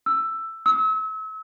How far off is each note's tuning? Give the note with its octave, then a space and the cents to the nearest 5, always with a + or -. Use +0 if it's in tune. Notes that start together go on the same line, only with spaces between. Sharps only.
E6 +10
E6 -35